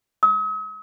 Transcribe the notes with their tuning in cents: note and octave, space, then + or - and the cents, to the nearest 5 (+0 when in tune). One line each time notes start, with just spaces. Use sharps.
D#6 +45